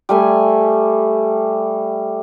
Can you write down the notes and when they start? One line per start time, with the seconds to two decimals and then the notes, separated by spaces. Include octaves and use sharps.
0.09 G3 A3 G#5